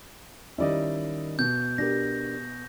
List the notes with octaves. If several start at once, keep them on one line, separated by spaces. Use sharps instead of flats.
D#3 G3 C#4 E4 D5 D#5
B2 G6
D4 G4 A#4 A#6